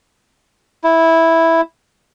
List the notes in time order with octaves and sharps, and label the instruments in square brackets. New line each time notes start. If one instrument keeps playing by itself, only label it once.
[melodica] E4